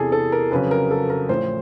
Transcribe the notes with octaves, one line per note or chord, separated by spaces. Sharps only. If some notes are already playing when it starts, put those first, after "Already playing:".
Already playing: E2 C3 E3 G#4 A4
A4
A#4
F2 C#3 F#3 B4
A#4
A4
A#4
A1 A2 F3 C5